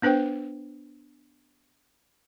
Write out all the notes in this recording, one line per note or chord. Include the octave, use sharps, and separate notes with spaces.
B3 D4 B4 C5 G5